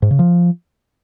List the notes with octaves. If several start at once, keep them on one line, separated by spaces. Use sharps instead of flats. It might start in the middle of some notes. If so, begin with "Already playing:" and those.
G#2
C#3
F3